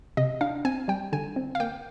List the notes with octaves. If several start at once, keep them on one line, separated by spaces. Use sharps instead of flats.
C3 D#5
D4 F5
C4 G#5
G3 G5
D3 G#5
C4
F5
A#3 G5